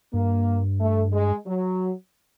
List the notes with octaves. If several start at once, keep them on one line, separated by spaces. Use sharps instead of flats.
G2 A#3
A3
G#3
F#3